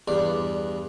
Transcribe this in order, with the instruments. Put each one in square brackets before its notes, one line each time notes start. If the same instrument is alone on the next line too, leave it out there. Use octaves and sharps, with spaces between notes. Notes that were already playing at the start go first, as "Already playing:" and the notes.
[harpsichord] E2 G2 D5